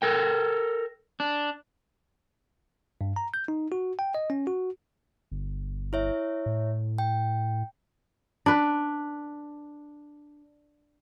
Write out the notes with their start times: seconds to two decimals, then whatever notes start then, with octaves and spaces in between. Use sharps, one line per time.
0.02 A4 A#4 G5
1.20 D4
3.01 G2
3.16 A#5
3.34 G6
3.48 D#4
3.72 F#4
3.99 G5
4.15 D#5
4.30 C#4
4.47 F#4
5.31 G1
5.93 E4 C#5 E5
6.46 A2
6.98 G5
8.46 D4 B4